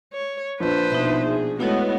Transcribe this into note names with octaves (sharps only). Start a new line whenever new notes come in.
C#5
A#1 D4 B4 C5
B2 D#4 E5 C6
G#4
G#3 A3 B3 E4 F#4 C#5 D#5